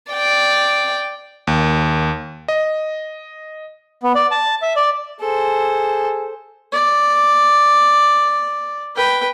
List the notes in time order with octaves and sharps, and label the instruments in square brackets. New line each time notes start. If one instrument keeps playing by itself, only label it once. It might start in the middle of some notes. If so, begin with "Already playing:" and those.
[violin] D5 G5
[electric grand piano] D#2
D#5
[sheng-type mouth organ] B3
D5
A5
E5
D5
[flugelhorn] G#4 [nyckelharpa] A4 C5
[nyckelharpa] D5
B4 G5